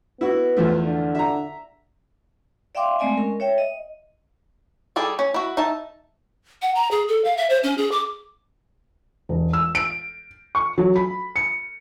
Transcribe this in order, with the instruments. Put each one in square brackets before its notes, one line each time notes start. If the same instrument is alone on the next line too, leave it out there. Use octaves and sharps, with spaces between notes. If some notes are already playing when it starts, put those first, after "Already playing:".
[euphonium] B3 [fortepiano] E4 F#4
[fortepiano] E2 F3 A3
[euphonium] D3
[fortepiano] E5 A#5
[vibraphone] D5 E5 F5 G5 C6 D6
G#3 A3 C4 D5 D#5 G#5
C#4 A#4
C#5 E5 G5
D#5
[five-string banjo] G3 G#4 A4 D5
C#4
E4 F#4
D#4 E5 A5
[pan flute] F#5
A#5
G#4
A4
F5
E5
C5
C#4
G#4
D6
[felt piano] E1
E6
D7
C#6
F#3
B5
C#7